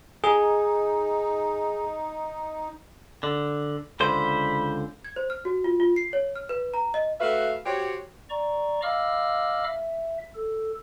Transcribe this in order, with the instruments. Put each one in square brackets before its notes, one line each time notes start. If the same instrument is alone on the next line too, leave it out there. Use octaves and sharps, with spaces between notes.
[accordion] D#4 [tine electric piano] G#4
[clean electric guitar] D3
[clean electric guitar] C#2 D3 C5 [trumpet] B5
[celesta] G#6
C5
F6
F#4
F4
F4
C7
C#5
F6
B4
A#5
D#5
[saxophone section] A3 F#4 B4 E5 F5
F#4 G4 C5 C#5
[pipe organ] D5 A#5 C#6
D#5 F5 B5 D6 E6 F6
E5
A4